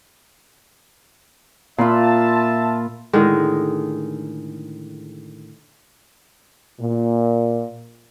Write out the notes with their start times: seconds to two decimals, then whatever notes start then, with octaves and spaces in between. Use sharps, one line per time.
1.78 A#2 F4 E5 A5 B5 C6
3.13 A2 D3 D#3 G#3
6.80 A#2